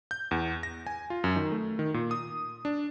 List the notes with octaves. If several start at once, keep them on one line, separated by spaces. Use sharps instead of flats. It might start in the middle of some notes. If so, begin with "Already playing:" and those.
G6
E2
A#6
G#5
F4
F#2
D#3
A3
D#3
A#2
D#6
D4